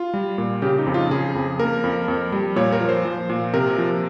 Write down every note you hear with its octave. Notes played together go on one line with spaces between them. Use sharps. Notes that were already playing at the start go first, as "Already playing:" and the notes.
Already playing: F4
G3
A#2
C#3 G4
D#4
F2
F4
C#3 G#4
F2
A#3 A#4
F2
F2
G3
A#2 C#5
A#4
F3
C5
F3
A#2
C3 A#4
F3